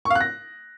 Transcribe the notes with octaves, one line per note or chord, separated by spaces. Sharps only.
C#6
F5
F#6
A#6